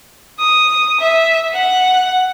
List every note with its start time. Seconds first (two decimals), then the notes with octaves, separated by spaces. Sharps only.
0.39 D#6
1.01 E5
1.53 F#5